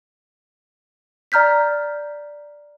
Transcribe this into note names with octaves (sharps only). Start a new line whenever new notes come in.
D5 A#5 F6 G6 B6